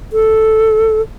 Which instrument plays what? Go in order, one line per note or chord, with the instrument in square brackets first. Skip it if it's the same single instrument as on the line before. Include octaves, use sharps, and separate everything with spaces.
[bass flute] A4